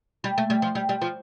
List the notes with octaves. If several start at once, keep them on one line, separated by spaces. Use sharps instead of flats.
G3
A3
G3
F3
G3
G3
F3